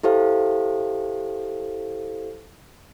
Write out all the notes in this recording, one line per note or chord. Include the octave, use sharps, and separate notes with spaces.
E4 G4 A4 C5 F5